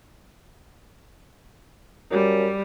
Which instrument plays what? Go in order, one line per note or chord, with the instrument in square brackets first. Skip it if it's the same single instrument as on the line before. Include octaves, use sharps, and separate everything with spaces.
[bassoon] F#2 [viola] G3